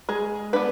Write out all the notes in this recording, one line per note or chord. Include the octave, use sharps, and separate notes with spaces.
G#3 G#4
B3 D4 B4